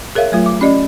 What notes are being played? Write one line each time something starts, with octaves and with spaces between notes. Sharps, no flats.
G#4 A#4 C#5 E5 F5
F#3 A3 F4
D6
C#4 G4 D5 D#5